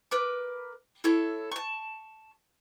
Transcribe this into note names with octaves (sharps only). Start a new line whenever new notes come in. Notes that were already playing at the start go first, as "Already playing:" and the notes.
A#4 B4 D6
E4 A4 C#5
A5 C#6